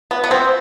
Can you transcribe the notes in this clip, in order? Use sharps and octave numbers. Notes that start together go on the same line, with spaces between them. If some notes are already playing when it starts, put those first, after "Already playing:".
B3
B3
C4